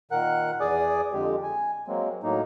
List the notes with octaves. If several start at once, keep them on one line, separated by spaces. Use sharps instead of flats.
A#2 D#3 A#4 F#5 F#6
E2 G#4 D5 G#5 D6 D#6
F2 D3 G#3 G4
G#5
F#3 G#3 A#3 C4
A2 F#3 A#3 D#4